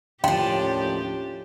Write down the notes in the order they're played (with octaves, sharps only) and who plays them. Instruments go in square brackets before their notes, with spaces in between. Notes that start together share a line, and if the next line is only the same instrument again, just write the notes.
[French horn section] D#2 A2 C#4 [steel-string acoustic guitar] F3 D4 [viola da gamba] G4 [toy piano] F5 G5